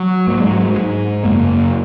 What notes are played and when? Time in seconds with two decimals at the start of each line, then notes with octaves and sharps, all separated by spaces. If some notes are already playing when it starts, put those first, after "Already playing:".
Already playing: F#3
0.27 G#2 A#3
0.40 G#3
0.53 F#3
0.65 G#3
0.77 G#2
1.24 F#2 C#3 A#3